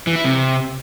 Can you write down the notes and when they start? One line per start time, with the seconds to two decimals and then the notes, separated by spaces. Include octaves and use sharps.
0.07 E3
0.16 E4
0.25 C3